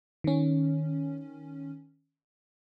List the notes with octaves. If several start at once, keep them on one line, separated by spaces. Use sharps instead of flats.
D#3 C#4